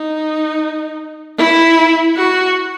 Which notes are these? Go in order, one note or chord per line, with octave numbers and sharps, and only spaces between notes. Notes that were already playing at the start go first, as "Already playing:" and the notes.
Already playing: D#4
E4
F#4